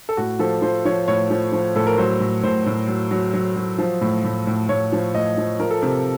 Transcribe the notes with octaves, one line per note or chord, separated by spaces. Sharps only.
A4
A2 F#4
F3 A4
F3 C5
F3 C#5
A2 C#5
F3
F3
A2 A4
A#4
F#3 C5
A2
A2 C5
A2
F#3
F#3
F#3
F#3
F3
A2
A2
A2
A2 C#5
F3
A2 D#5
F3
F3 A#4
A4
C3 A#4